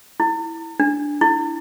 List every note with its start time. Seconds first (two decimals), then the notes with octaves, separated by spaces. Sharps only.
0.20 E4
0.80 D4
1.21 E4